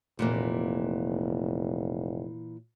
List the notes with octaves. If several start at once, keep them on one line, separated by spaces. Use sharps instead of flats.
F1 A#2 E3 A#3